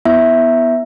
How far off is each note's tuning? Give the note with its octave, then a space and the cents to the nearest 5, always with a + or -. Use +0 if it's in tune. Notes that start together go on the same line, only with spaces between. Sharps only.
B3 +0 E4 -5 E5 +0